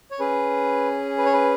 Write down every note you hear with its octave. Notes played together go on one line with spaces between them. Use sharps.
C#5
C#4 G#4 B4
B4
C#5
B4